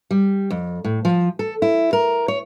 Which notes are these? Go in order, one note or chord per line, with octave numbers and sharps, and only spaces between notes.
G3
F2
A2
F3
A4
E4
A#4
C#5